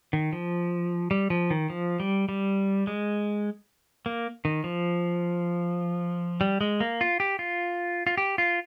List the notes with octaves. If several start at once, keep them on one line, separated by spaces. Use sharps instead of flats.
D#3
F3
G3
F3
D#3
F3
G3
G3
G#3
A#3
D#3
F3
G3
G#3
A#3
F4
G4
F4
F4
G4
F4